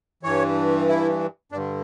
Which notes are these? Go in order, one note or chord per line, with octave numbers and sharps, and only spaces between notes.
G2 E3 C#5
E4
G2 D4
D3